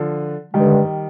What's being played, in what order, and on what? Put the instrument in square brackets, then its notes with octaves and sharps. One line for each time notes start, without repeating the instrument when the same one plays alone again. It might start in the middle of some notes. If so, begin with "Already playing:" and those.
Already playing: [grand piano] D3 F3
[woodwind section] G2 D3 G#3 [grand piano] D#3 G3